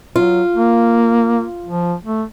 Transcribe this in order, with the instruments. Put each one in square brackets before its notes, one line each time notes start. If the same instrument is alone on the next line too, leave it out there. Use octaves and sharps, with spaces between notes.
[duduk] F#3 [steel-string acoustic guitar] F4
[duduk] A#3
F3
A3